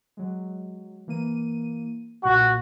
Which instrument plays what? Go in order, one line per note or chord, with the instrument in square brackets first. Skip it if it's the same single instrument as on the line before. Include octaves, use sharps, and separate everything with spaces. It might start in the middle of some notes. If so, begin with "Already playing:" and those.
[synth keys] F#3 G#3
E3 A#3 D#7
[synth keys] B1 A#2 [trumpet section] F#4